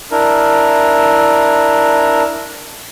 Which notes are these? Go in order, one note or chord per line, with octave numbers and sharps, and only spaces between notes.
D4 E4 A#4